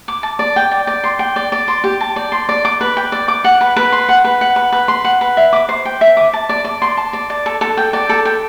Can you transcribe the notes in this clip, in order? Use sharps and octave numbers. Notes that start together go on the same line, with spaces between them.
D6
A5
D5
G5
D5
D5
C6
G5
D5
D5
C6
G4
A5
D5
C6
D5
D6
B4
G5
D5
D6
F#5
B4
B4
C6
F#5
B4
F#5
B4
B4
C6
F#5
B4
E5
D6
C5
G5
E5
D6
A5
D5
D5
C6
A5
D5
D5
A4
A4
G5
D5
A4
G5